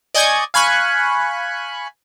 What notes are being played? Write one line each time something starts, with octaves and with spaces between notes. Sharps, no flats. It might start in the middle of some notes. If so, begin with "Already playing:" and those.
D5 D#5 G#5 C#6 G6 G#6
F5 G#5 B5 C#6 F#6